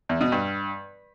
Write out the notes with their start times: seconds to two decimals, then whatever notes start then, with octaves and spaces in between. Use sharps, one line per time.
0.09 E2
0.21 B2
0.32 G2